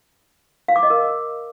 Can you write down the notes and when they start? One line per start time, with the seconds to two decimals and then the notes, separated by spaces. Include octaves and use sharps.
0.68 F5
0.76 D6
0.83 D#5
0.90 A#4